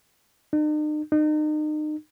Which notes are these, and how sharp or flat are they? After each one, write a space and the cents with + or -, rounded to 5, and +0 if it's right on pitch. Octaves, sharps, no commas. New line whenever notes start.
D#4 -45
D#4 -35